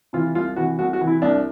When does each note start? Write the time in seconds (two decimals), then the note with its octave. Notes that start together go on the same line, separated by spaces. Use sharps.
0.13 C3 E3 F4
0.35 C2 F4
0.56 C3 E3 F#4
0.79 C2 F#4
0.93 F#4
1.01 C3 E3
1.07 E4
1.22 C2 D4